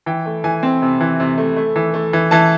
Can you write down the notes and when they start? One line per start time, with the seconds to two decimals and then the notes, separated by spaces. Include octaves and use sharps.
0.06 E3 G5
0.25 A3
0.44 E3 G#5
0.63 C4
0.82 C3
1.01 E3
1.20 C3
1.38 A3
1.56 A3
1.76 E3
1.94 A3
2.13 E3
2.31 E3 A5